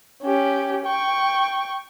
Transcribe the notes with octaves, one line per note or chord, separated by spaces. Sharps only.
C#4 G4
G5 C#6